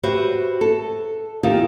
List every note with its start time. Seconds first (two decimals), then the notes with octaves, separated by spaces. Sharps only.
0.03 F#4 G4 B4 C5 E5
0.61 A4
1.43 E2 D#3 F4 G4